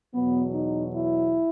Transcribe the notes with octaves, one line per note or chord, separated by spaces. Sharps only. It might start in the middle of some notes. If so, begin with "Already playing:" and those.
E2 B2 F#3 B3
D#4
E4